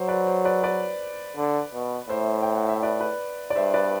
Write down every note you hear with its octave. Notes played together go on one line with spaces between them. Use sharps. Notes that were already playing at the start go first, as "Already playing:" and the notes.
Already playing: F#3 C5
B4 D5
C5
B4 D5
B4 D5
D3
B2
A2 C5 E5
G5
F#5
E5
B4 D5
B4
D5
G2 C5 E5
B4 D5